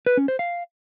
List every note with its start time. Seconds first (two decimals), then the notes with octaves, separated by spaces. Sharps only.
0.06 B4
0.17 C#4
0.28 C5
0.39 F5